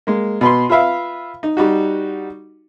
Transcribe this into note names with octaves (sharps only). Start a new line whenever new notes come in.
G#3 A#3
B2 B4 C6
F4 B4 E5 F5
D#4
G3 D#4 F#4